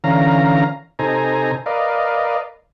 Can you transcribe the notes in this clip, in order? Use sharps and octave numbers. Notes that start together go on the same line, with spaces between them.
D3 E3 C#4 F5 A#5
C3 D#4 A4 C5 G#5 A#5
A#4 B4 D5 D#5 F5